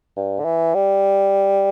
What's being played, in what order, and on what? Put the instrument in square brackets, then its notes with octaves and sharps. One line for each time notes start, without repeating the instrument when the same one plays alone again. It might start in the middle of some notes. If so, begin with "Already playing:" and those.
[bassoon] G2
D3
E3
G3